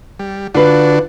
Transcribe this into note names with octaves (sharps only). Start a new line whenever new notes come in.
G3
D3 D4 F4 F#4 B4 F5